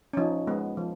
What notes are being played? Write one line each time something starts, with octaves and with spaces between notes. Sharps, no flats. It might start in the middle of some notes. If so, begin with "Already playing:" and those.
C#4
F3 D#4
G#3 B3
F3